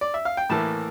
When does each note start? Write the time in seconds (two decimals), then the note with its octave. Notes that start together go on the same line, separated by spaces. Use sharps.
0.01 D5
0.14 E5
0.25 F5
0.37 G5
0.50 A2 E3 A#3 A5